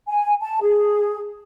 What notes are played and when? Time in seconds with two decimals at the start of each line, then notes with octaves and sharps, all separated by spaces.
0.08 G#5
0.41 A5
0.62 G#4